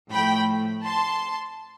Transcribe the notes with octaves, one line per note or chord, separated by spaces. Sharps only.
A2 F3 A3 G5 B5
A5 C6